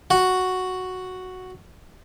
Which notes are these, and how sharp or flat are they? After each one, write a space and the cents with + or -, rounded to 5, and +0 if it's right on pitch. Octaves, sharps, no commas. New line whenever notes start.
F#4 +0 F#5 +0